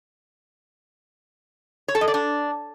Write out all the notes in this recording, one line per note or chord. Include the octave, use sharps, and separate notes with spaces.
C#5
A4
D#5
D5
D4